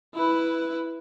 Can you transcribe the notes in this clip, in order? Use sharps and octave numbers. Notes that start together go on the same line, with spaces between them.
E4 B4